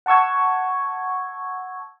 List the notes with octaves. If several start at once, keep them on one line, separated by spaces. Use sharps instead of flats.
F#5 A5 C#6 E6 G#6